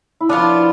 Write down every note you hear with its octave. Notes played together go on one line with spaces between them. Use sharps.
E4
F3 B3 D4 F4